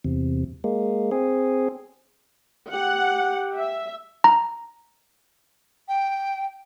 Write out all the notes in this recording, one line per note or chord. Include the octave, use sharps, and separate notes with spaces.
E2 C3
G#3 A#3
C4 G#4
G4 F#5
E5
A#5
G5